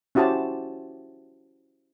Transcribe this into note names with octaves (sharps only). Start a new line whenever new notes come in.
C#4 E4 F#4 G4 C5 A5